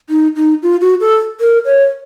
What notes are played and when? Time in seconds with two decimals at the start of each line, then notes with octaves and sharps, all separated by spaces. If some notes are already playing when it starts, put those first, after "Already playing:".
0.10 D#4
0.36 D#4
0.63 F4
0.81 F#4
1.01 A4
1.40 A#4
1.65 C#5